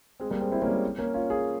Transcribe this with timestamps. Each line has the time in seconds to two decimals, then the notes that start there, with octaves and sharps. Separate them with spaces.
0.20 G#3 C4
0.31 G3 A#3
0.41 G#3 C4
0.52 C4 E4
0.62 A#3 C#4
0.67 G3
0.73 G#3
0.98 A#3 C#4
1.14 C#4 F4
1.30 F4 G#4